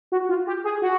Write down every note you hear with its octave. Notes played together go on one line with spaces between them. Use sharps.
F#4
F4
G4
G#4
F#4